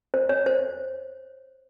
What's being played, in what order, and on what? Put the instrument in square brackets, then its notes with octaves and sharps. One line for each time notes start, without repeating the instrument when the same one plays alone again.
[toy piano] C5
C#5
C5